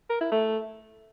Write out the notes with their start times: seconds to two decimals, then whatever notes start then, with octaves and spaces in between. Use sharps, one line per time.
0.10 A#4
0.20 E4
0.31 A3